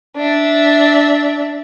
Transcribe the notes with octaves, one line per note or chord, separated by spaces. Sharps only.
D4 E5